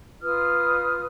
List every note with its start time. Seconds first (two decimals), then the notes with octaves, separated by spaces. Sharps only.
0.21 F4 B4 D#6 F6